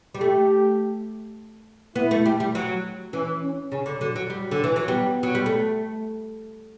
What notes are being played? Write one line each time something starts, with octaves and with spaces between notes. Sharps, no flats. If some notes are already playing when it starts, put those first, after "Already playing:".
G3
A3 G4
B3 E4
A3
G3
G3
F#3
E3 C#4
C#4
C#3 C#4
D3
D3 F#3
F#3
F#3 G3
D3
E3
F#3
G3 B3
F#3
G3
A3